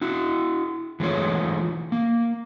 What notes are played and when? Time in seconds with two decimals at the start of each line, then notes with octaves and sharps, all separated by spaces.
0.01 E4 F#4
1.00 E3 G#3 A3 F4 C#5
1.92 A#3